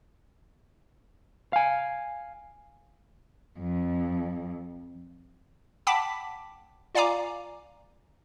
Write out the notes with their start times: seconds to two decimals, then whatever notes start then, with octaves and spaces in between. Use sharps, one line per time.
1.53 F5 G#5
3.59 F2
5.87 F#5 G5 A5 B5 D6 B6
6.95 F4 D5 F5 G#5 A#5 D6